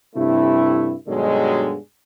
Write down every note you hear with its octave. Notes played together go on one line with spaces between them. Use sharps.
G2 C3 A3 E4
G2 B2 D3 D#3 F#3 G#3